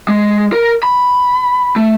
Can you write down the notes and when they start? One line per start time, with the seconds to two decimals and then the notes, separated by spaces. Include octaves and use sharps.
0.09 G#3
0.53 A#4
0.83 B5
1.76 A3